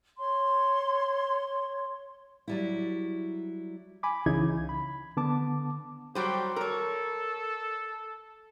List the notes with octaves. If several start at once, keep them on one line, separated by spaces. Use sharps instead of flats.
C#5 C6
F#3 G3 E4
G#5 B5 D6
C2 C#3 E3 D#4 E4 G#6
B5
D3 B3 A5 D6
F#3 G3 G4 C5
A4 A#4 C#5